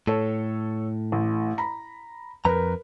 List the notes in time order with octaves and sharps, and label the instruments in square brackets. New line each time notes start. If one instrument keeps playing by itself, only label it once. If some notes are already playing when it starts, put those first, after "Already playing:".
[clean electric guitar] A2 [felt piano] A4 C#5
[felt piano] A1
A#5 B5
[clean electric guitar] F2 A#5 [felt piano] A#4 B4